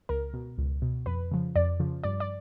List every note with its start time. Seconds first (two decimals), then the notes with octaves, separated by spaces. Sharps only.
0.09 C#2 A#4
0.34 B2
0.58 C#2
0.82 B2
1.06 F2 B4
1.31 C#3 F3
1.56 F2 D5
1.80 C#3 F3
2.04 G2 D5
2.20 D5